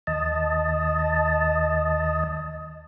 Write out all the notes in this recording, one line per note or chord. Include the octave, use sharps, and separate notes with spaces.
D#2 D#5 A5